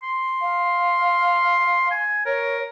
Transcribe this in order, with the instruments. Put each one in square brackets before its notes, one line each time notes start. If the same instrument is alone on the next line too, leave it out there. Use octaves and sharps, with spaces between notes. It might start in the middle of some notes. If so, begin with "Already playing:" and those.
[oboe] C6
[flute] F5
[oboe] G#5
[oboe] A#4 [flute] C#5